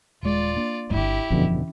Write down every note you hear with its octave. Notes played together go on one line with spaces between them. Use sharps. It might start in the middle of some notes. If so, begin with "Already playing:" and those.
D#1 G#3 F4 D5
A#3 D4
G1 D3 E4 G4
F#1 E2 B2 D3 E3 F3 C#4